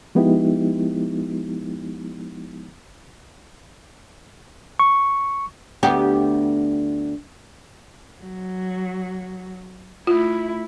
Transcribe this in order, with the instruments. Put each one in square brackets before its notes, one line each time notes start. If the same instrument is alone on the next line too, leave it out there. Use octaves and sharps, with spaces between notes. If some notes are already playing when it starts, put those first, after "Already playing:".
[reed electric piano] F3 G#3 B3 D#4 E4 G4
[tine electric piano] C#6
[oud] D2 B3 G4
[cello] F#3
[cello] A3 E4 [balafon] F4